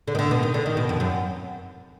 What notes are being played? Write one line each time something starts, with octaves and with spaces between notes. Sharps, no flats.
D3
D#3
D3
B2
D#3
D3
D#3
B2
F2
F#2